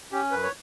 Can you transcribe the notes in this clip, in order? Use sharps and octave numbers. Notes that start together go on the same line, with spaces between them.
C#4 G4
F#2 B4
C#5